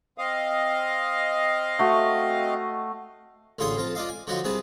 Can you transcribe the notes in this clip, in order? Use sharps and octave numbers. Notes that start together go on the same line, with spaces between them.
C4 D#5 F5
A3 F#4
A1 D3 F4 G#4 C#5 C6
F2 F4 A5
D4 F4 D#5 F5
G#5
D3 F3 F#3 D#4 F4 F#4
C2 C3 G#4 B4 A5